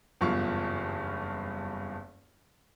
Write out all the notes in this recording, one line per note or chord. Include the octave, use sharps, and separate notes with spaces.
F#1 E2 G2 F4 C#6